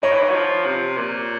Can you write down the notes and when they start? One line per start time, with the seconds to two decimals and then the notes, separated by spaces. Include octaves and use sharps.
0.03 D#3 C#5
0.12 E3
0.22 D#3
0.30 F#3
0.33 F3
0.65 C3
0.97 A#2